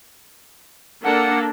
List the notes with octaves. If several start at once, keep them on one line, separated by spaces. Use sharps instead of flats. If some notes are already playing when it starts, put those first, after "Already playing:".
A#3 D4 A4 F#5